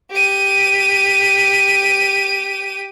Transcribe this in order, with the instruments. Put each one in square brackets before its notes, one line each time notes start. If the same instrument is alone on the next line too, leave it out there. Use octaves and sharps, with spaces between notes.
[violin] G4 D#7